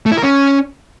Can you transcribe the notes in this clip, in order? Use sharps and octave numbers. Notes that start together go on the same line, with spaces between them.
A3
E4
A#4
C#4